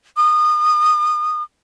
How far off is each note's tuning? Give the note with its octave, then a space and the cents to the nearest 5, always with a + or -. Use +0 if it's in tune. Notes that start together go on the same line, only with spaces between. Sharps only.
D#6 -25